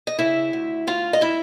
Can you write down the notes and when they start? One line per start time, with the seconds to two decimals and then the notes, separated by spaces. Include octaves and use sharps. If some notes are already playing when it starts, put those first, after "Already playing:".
0.07 D#5
0.19 C#3 E4 E5
0.53 D2
0.87 D2 F4 F5
1.13 D#5
1.21 E4 E5